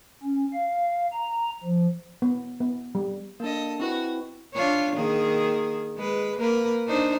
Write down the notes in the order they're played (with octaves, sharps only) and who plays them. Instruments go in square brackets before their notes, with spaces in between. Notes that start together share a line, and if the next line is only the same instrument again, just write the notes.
[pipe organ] C#4
F5
A#5
F3
[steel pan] B3
B3
G3
[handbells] A#3 D4 [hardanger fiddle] A4 D#5
[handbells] C4 E4 B4 [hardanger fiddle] F#4
[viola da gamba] D4 F4 C#5
D#3 A#3 G#4
G#3 B4
A#3 A#4 B4
D4 D#4 C5